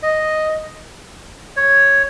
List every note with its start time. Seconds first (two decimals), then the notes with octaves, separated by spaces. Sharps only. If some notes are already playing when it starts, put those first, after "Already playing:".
0.03 D#5
1.57 C#5